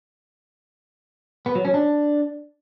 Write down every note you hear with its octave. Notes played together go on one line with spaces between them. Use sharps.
B3
F#3
C#4
D4